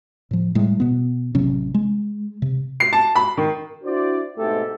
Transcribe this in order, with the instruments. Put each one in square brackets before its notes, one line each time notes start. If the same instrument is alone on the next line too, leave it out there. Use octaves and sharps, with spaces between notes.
[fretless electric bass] A2 F3
A2 G3 G#3
B2 B3
A1 C3 F#3 C#4
G#3
C3
[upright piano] C7
A5
B5
D#3
[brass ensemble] D4 E4 F#4 C5 D5
G#2 B2 A3 C4 G4 A4